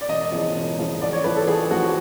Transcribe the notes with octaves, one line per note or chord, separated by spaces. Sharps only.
D5
E1 D#5
E2 C#3 F3
E1
E2 C#3 F3
A1 D5
C#5
A2 F3 B4
A4
A1 G#4
A2 F3 F#4